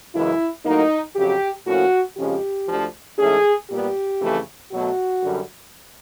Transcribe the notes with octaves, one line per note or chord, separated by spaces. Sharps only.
F#2 C#3 E3 G#3 E4
A2 F#3 A#3 D#4
F2 C#3 F#3 G4
A2 F3 A#3 C#4 F#4
F2 C#3 F3 G#3 C#4 G4
D2 D3 F3
G#2 E3 A3 C#4 G#4
A#2 G3 B3 G4
F2 C#3 E3 A3
B2 F#3 A3 F#4
F#2 D3 G3